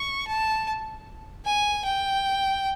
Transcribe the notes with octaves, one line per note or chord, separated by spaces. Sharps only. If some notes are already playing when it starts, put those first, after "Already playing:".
Already playing: C#6
A5
G#5
G5